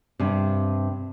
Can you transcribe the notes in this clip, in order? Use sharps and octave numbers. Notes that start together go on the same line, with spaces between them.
G2 C3